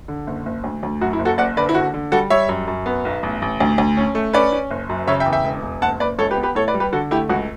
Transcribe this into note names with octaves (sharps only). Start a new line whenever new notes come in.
D3
F#1
F#1
D2
D2
F#2 F#4
E4
F#1
F#4 A4
F#1 D5 F#5
D3 B4 D5
E4
D3 F#4
D3
G3 F#4 A4
G3 C#5 E5
F#2
F#2
B3
B1
A1
A1
D2
D2
C#4
A3
C#4 B4 D5
C#4
F#1
F#2
C#3 C#5 E5
E5 G5
E2
E5 G5
E1
E1
F#1 F#5 A5
F#1 B4 D5
C#2 A4 C#5
G4 B4
B3
G4 B4
A2 A4 C#5
B4 D5
G3
G4 B4
D3 F#4 A4
A3 E4 G4
C#2 F#4